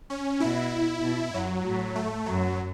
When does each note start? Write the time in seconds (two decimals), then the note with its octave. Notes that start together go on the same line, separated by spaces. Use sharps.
0.10 C#4
0.40 B2 E4
1.02 B2
1.34 F#2 F#3
1.64 A2
1.95 A3
2.26 F#2 F#3